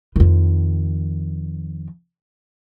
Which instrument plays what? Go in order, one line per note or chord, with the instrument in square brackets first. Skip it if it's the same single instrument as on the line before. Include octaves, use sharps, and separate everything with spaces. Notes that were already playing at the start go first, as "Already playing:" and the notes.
[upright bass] F2 D#3